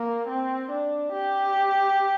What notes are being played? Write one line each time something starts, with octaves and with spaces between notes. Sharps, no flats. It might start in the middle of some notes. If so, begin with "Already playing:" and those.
Already playing: A#3
C4
D4
G4